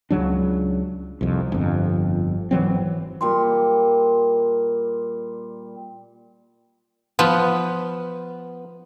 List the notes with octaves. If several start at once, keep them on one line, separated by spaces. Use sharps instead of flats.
C#2 C#3 F#3 D4
C2 F2
G1 F2
G#1 E3 F#3 C4
A#2 G3 C6
F3 B3 B4